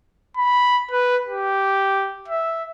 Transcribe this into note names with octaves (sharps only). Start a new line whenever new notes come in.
B5
B4
G4
E5